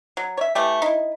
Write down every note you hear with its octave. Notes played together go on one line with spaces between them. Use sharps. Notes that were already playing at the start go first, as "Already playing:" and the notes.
F#3
C#5 E5
E3 A3 G4
D#4 E4